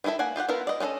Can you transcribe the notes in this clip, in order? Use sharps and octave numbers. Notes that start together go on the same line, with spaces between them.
D#3 G3 E4 A4 E5
A#3 F#5 G#5
F4 G4 F5 F#5
B3 E4 F4 A#4
D5 D#5
C#4 D#4 F4 A4 D#5